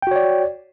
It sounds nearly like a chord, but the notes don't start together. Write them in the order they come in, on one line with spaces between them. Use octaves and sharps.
G5 F#4 C#5 D5